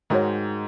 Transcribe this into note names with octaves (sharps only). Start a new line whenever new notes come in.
G#2 D#3 G#3 F#4 C#5